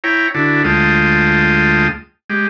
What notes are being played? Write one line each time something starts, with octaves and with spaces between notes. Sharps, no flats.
E4 C#5 G5 A#5
D3 D4 E4 F#4
D2 G#3 F4 G5 A5 D#6
G#3 G4